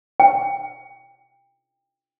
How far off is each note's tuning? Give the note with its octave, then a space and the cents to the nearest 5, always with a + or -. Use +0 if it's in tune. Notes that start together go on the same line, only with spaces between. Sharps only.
G5 +20